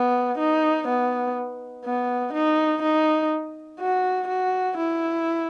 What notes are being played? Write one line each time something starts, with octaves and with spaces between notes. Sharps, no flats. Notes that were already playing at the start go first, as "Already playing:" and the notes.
Already playing: B3
D#4
B3
B3
D#4
D#4
F#4
F#4
E4